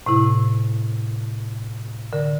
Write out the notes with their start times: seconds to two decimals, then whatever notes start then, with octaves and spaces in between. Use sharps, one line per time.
0.06 A2 C3 E4
2.13 D3 A#4